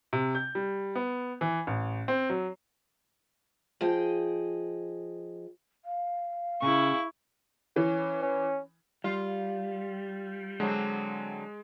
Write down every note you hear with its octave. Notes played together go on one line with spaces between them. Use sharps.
C3
G6
G3
B3
E3
A1
C4
F#3
F3 G#4 D#5 G5
F5
C#3 E4 C#6
E3 C#4
C#4
G3 F4
D3 F#3 G#3 C4